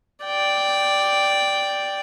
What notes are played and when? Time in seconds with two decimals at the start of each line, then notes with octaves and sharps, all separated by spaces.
0.24 D5 G5